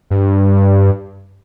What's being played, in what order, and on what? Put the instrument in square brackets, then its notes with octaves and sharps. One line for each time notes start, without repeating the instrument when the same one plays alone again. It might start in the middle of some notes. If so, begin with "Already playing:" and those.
[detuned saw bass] G2